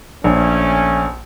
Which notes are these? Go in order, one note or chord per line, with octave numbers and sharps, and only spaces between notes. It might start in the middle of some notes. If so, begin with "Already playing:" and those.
A#1 A3 C#4